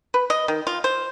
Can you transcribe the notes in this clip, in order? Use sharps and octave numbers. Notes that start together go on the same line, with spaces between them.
B4
D#5
D#3
F4
C5